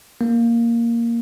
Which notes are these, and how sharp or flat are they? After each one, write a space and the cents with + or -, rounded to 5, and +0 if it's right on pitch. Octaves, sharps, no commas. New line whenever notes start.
A#3 +0